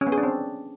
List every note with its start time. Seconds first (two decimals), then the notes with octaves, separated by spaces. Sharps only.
0.01 C#4
0.07 B3
0.12 G#4
0.18 D4
0.23 C4